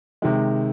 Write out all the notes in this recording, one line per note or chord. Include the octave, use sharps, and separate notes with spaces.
C3 D#3 G#3